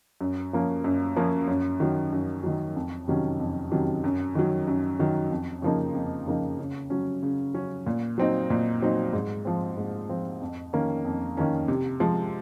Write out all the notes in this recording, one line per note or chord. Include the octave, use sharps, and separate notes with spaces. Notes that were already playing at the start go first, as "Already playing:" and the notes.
F#2
F3 A#3 C#4
F#2
F3 A#3 C#4
F#2
D#3 F#3
F#2
D#3 F#3
F2
C3 D#3 F#3 C#4
F2
C3 D#3 F#3 C#4
F#2
D#3 F#3
F#2
D#3 F#3
F2
C#3 F3 A#3 D#4
F2
C#3 F3 A#3 D#4
C#3
F#3 C#4
C#3
F#3 C#4
A#2
F#3 C4 D#4
A#2
F#3 C4 D#4
G#2
F3 C4
G#2
F3 C4
F2
D#3 A#3 C#4
F2
D#3 A#3 C#4
C3
F3 G#3